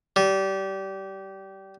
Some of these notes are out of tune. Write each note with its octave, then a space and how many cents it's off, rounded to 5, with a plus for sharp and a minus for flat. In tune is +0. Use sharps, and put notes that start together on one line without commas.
G3 -25